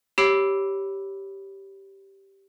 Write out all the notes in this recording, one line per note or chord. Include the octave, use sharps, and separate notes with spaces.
G4 C#5 B5 E6 C7 D7